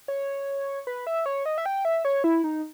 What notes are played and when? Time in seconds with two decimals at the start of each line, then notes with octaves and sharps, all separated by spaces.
0.08 C#5
0.87 B4
1.07 E5
1.26 C#5
1.46 D#5
1.58 E5
1.66 G5
1.85 E5
2.05 C#5
2.24 E4
2.44 D#4